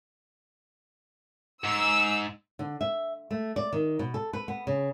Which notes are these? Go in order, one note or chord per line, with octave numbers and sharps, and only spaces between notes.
G#2 E6
D3
E5
A3
D5
D#3
B2
A4
B4
B3
C#3